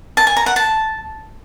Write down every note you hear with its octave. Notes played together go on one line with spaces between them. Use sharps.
A5
G#5
A#5
F#5
A5